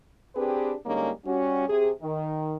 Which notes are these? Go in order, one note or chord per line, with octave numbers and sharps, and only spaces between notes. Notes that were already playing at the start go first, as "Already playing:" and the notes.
C4 D4 G4 G#4 B4
D3 G3 G#3 A#3 C#4 D#4
G3 C#4 F#4
C3 G#4
D#3